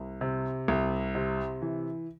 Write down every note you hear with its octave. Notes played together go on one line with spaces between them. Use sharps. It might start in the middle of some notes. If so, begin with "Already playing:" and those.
Already playing: C2
C3
C2
C3
E3